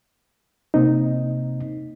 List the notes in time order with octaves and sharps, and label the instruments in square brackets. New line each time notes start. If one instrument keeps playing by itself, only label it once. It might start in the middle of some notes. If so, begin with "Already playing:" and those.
[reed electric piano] C3 A#3 C4 D#4